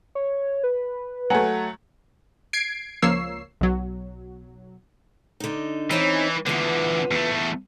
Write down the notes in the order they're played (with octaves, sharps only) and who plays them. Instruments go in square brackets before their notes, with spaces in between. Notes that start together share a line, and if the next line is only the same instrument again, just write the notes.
[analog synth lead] C#5
B4
[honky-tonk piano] F#3 A3 [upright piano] F#5 G#5
[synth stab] G#6 C7 D7
C#2 F3 A#3 C#5 E6 C7
B1 F#3
[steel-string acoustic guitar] D3 D#4
[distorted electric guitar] E3 [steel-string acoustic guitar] C4 C#4 D#4
[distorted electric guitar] E2 D3 [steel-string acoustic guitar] B3 F4
[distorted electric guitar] E2 A3